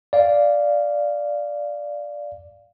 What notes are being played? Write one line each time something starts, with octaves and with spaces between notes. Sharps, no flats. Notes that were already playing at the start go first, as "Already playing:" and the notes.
D5 F5